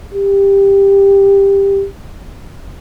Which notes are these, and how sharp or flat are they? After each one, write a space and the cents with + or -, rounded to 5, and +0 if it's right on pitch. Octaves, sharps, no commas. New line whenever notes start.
G4 +10